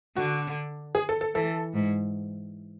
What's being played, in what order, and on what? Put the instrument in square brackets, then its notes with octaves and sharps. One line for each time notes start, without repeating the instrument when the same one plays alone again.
[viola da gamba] D3 [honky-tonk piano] F#4
[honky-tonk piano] G#4
A4
A4
[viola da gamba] E3 [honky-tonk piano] A4
[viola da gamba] G#2